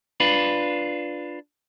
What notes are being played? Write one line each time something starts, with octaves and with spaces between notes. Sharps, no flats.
D4 F4 B4